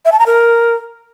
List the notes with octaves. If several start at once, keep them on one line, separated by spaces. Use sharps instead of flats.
E5
A5
A#5
A#4